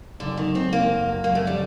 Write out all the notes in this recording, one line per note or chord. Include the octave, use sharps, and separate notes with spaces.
F#1 D3
D#3
F#1
C4
F#1 A#3
F#2
F#3 A#3
A3
D#3 G3